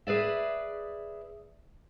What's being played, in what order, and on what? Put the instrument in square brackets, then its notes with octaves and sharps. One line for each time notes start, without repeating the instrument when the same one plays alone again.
[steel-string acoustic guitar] G#4 B4 D5 E5